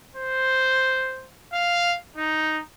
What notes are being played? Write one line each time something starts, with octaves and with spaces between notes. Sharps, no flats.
C5
F5
D#4